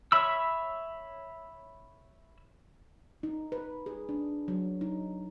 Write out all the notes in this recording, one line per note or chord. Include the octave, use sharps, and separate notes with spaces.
C#5 E5 B5 E6
D#4
B4
G#4
D4
F#3
D#4